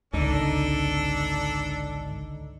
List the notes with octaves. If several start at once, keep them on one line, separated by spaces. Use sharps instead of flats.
G#1 C#2 D3 D4 D#4 A4 A5